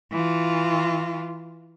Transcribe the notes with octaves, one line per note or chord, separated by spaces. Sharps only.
E3 F4